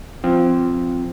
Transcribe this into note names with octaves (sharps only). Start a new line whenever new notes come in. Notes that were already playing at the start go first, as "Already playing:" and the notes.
F3 C4